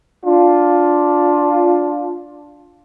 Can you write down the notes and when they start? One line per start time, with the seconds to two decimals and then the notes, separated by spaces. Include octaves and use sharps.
0.24 D4 F4